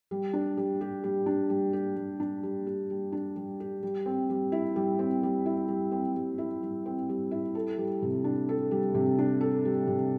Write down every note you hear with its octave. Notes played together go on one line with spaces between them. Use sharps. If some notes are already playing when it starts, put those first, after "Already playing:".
G3
D4
G3
G4
G3
D4
G3
G4
G3
D4
G3
G4
G3
D4
G3
G4
G3
C4
G3
E4
G3
C4
G3
E4
G3
C4
G3
E4
G3
C4
G3
E4
A4
G3
C3
D4
A4
G3
C3
D4
A4
G3
C3